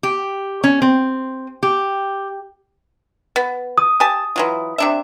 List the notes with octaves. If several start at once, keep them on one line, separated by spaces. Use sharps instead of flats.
G4
C#4
C4
G4
B3
D#6
G4 G#5 A5
E3 F#3 F4
C3 D4 E5